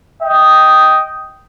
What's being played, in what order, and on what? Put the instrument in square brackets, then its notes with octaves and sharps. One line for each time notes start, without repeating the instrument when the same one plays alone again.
[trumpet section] D#5 G5